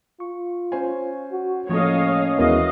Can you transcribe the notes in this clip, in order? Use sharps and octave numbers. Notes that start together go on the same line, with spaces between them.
F4 C#6
C#4 C5 G#5
F#4
A2 F3 A#3 C#4 A4 C#5 D#5 F5
D#2 E3 G#3 B3 F#4 A#4 D#5 F5